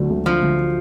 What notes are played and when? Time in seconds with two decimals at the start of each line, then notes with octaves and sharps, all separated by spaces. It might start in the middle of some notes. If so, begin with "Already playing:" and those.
Already playing: D2 D3 F#3 A3
0.10 D2
0.26 D3 F3
0.42 D2